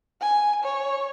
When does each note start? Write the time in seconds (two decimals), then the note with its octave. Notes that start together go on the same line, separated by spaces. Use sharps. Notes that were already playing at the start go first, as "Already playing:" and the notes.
0.21 G#5
0.64 C#5